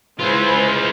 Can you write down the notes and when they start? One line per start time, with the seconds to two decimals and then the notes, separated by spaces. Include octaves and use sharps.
0.19 G#3 E4 F4 B4 C5